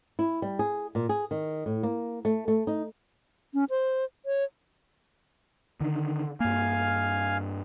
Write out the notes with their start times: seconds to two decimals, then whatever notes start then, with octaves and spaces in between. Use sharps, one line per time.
0.19 E4
0.42 G3
0.59 G#4
0.95 A#2
1.09 G#4
1.31 D#3
1.66 A2
1.83 A#3
2.25 A3
2.48 A3
2.67 D#4
3.54 C#4
3.70 C5
4.26 C#5
5.81 D3 D#3
6.40 G2 A#3 F5 G#5 F6